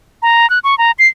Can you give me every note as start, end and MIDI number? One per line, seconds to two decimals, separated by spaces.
0.22 0.49 82
0.50 0.59 90
0.64 0.77 85
0.78 0.91 82
0.99 1.07 96